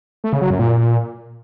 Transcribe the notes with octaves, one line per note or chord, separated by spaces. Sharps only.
A3
C#3
F#3
F#2
A#2